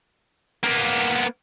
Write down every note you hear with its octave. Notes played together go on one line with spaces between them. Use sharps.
A#3 B3